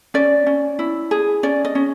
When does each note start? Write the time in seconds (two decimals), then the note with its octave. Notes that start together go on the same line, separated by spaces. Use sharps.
0.14 C#4 D5
0.46 C#4
0.79 E4
1.11 G#4
1.43 C#4 D5
1.65 D#5
1.75 C#4